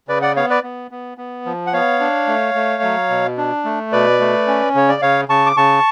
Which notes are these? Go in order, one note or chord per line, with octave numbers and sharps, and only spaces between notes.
C#3 B4 D5
D5 F#5
B3 C#5 F5
B4 D5
B3
B3
B3
F3
F#5
B3 C#5 F5
D4
A3
A3
F#3
B2
D4
A3
B2 B4 D5
A3
C#4
C#3 C#5
D5
C#3 C#5 F5
C#3 A5 C#6
D6
C#3 A5 C#6